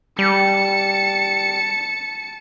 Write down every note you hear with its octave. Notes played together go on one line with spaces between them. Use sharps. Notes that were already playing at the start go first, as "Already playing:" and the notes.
G3 A5 C#7